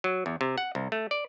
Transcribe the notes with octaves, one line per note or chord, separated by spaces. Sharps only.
F#3
E2
C3
F#5
C2
A3
D5